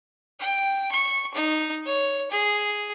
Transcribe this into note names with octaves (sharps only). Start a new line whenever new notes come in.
G5
C#6
D#4
C#5
G#4